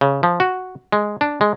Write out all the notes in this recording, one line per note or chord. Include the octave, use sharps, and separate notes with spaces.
C#3
F3
F#4
G#3
D4
G#3